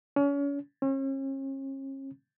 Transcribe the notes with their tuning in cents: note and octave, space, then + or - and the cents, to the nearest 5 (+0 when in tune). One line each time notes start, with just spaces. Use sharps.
C#4 +35
C#4 -40